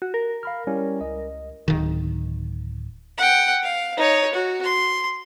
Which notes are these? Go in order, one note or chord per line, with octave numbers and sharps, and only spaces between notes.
F#4
A#4
F5 B5 F6
G3 C#4 E4
C#2 D#5
D1 D#3
F#5 G5
F5
D#4 C#5
F#4
C6